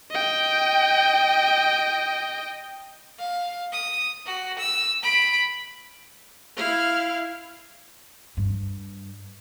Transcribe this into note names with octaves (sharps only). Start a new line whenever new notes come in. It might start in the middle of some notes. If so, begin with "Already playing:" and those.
D#5 G5
F5
D#6
F#4
E6
B5 D7
E4 F5
G2